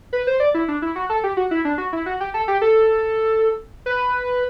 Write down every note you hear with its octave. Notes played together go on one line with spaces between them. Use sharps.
B4
C5
D5
E4
D4
E4
F#4
A4
G4
F#4
E4
D4
F#4
E4
F#4
G4
A4
G4
A4
B4